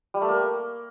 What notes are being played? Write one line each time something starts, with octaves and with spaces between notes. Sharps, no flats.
G3
A3
A#3